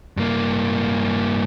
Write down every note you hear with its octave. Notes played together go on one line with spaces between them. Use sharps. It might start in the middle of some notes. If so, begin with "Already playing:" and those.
G2 A#3